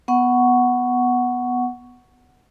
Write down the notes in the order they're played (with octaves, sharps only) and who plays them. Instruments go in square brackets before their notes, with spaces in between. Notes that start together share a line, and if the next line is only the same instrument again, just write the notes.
[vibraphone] B3 F#5 C#6